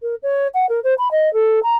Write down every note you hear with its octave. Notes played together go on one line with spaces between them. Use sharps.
A#4
C#5
F#5
A#4
C5
B5
D#5
A4
A#5